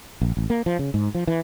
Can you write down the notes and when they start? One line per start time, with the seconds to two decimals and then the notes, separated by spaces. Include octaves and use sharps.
0.21 A#1
0.37 A1
0.50 A#3
0.66 F3
0.79 C#3
0.94 G#2
1.15 F3
1.27 E3